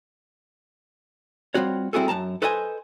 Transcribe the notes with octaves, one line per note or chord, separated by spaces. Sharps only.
G3 C4 F4 F#4 C#5
G3 C4 E4 F#4 G#4 A4
F#2 G#3 A5 A#5
A4 B4 C5 D#5 G5 G#5